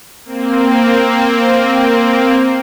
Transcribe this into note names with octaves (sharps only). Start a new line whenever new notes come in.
A#3 C4